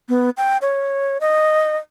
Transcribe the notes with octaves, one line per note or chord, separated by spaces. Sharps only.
B3
G5
C#5
D#5